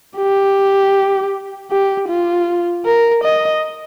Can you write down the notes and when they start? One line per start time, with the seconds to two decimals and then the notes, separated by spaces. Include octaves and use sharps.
0.17 G4
1.71 G4
2.09 F4
2.86 A#4
3.24 D#5